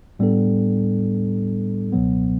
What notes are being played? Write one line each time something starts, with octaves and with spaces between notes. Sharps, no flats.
A2 G3 B3 D4 A4
C#2 B2 F#3 B3